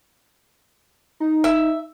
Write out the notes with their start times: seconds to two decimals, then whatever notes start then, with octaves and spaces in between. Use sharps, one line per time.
1.20 D#4
1.44 E5